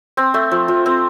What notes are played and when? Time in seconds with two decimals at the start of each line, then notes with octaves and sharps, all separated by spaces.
0.17 C4
0.34 A3
0.51 F3
0.68 F3
0.86 C4